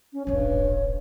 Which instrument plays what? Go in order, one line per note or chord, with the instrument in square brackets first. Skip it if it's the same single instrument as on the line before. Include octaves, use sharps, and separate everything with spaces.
[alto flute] C#4
[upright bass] D#1 A1 [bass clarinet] G2 [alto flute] C#5